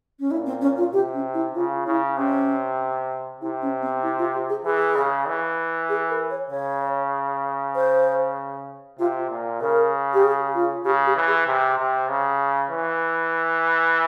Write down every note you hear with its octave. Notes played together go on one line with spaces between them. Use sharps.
C#4
A#2 E4
C4
C#4
F4
C3 G4
C#4
E4
C#3 F4
C#3 E4
C3 C#4
C3 E4
C#4
C4
E4
F4
G4
G#4
E3 G#4
C#3
E3
G#4
A#4
C#5
C#3 C#5
C5
C3 F4
A#2
C#3 A#4
G4
G#4
F4
C#3 G4
G4
E3
G#4
C3
C3
C#3
E3